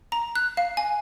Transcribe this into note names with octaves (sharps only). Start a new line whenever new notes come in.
A#5
F#6
F5
G#5